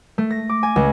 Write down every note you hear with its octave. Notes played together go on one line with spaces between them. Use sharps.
A3
A#6
D6
G#5
C#2